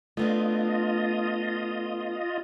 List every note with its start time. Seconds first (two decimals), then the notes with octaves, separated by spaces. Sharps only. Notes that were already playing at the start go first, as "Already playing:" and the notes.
0.17 A3 B3 D4 F4 D#5